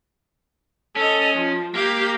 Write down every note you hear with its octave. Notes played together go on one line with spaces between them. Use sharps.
C#4 A4 D#5
F3
A#3 G4 F5